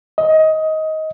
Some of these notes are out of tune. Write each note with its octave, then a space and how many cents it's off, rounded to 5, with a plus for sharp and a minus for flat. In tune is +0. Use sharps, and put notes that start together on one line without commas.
D#5 +20